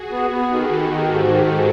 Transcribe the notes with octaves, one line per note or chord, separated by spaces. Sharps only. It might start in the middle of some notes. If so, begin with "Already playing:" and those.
Already playing: F#4 G#4
B3
B3
D#3 G4 A4
D#3
D#3
G#2
D#3
G#2